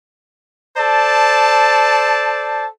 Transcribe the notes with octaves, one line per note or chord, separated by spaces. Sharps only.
A4 C5 D5 A5